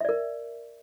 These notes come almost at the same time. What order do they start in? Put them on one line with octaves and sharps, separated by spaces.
E5 D5 A#4